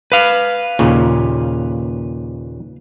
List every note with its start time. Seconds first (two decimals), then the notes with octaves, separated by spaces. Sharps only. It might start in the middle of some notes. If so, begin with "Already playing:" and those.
0.12 B4 F5
0.79 D#2 A#2 C#3